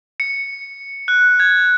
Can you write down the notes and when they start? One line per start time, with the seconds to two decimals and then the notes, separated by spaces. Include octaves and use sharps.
0.20 C#7
1.08 F#6
1.40 G#6